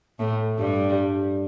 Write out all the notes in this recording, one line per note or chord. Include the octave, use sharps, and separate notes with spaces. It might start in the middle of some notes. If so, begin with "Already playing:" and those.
A2 A3
G2 G3